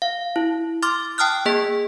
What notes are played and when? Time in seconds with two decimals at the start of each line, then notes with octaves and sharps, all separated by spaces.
0.02 F5
0.36 E4
0.83 C6 D6 F6 A6
1.18 G5 A5 D#6 F6 F#6
1.45 A#3 G#4 D#5 B6